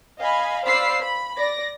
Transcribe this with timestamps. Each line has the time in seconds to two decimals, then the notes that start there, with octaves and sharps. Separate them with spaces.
0.20 D#5 F5 G#5 B5
0.66 C5 D5 F5 B5 E6 C7
1.01 B5
1.37 D5 A#6